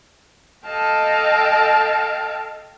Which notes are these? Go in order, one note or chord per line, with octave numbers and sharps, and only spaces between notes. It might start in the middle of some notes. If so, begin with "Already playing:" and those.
A4 D#5 F5 G5 A5